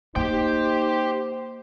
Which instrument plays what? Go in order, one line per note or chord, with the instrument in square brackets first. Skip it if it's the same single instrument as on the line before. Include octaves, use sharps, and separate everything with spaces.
[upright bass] A#3 [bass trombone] D#4 [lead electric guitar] G4 G5 [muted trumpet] C5